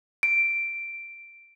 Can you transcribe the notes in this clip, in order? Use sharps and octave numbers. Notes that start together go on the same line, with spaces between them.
D7